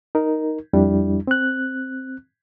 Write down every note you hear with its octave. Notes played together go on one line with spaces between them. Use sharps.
D#4 A#4
F2 G3 D4 E4
C4 F#6